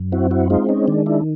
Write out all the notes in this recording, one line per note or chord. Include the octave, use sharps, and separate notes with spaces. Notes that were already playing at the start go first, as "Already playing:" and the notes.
Already playing: F#2
C4 E4 F#4
E4 F#4
G#3 D#4 F4
C#4 D#4
D#3 D4
D4 E4